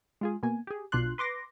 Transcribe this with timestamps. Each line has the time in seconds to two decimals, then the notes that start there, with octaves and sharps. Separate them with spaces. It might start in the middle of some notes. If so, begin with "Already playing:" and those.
0.21 G#3 F4 G#4
0.43 B2 A#3 G#5
0.67 G4 G#4
0.92 B1 B2 D4 F4 C6 F#6
1.18 B4 C6 D6 A#6